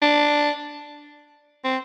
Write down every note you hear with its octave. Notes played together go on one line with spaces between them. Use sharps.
D4
C4